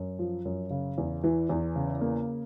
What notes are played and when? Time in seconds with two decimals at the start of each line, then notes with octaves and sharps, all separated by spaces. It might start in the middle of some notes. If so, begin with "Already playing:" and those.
Already playing: F#2
0.19 F3
0.45 F#2
0.71 C#3
0.98 E2
1.24 E3
1.49 E2
1.76 C#3
2.01 A#3